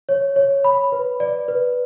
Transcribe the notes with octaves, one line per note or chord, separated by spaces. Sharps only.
C#5
C#5
B5
B4
D5
B4